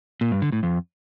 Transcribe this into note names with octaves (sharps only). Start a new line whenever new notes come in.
A#2
G2
D3
A2
F2